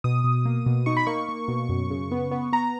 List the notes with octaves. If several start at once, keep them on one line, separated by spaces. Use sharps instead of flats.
B2 D#6
B2
A#3
B2
D#4 C#6
B5
A#3 C#6
A#3
B2
F#2
C#3
B3
B3
B3 A#5